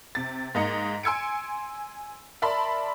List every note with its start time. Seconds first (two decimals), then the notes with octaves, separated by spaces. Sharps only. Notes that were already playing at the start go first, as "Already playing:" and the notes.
0.15 C3 A6
0.55 G#2 A#3 D#5 A#5 C#7
1.03 G#5 C6 E6 G#6 C#7 D7
2.42 A#4 D5 E5 A5 B5 C6